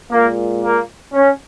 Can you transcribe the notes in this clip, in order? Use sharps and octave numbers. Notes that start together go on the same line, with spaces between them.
A#2 G#3 A#3
A#3
C#4